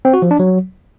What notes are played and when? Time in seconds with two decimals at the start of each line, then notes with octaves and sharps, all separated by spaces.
0.05 C4
0.14 F#4
0.22 F3
0.31 D4
0.39 F#3